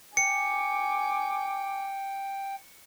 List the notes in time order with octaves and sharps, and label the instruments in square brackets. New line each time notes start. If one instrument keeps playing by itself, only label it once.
[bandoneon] G5 [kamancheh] G#5 D6 [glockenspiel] C#7